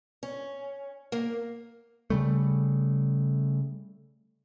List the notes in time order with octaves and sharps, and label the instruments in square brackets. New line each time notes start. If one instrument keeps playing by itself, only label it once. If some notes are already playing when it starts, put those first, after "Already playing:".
[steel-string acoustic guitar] C#4
A#3
[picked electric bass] C#3 G3 A3